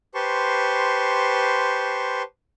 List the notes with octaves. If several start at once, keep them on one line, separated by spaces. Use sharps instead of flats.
G4 B4 C5 A5 C6 C#6